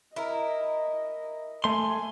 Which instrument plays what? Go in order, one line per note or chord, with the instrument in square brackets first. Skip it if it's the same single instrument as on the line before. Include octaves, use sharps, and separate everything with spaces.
[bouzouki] E4 A#4 [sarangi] D#5
[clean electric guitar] A3 C6 [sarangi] G#5